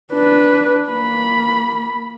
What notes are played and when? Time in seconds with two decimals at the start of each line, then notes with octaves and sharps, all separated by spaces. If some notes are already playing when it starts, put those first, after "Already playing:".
0.13 D4 B4
0.90 A#3 B5